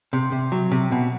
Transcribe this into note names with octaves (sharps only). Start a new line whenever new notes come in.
C3
C3
F#3
C3
B2